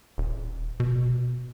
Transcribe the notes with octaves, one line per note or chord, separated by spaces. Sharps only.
D#1
B2